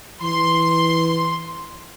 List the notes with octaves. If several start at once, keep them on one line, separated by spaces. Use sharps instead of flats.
E3 C6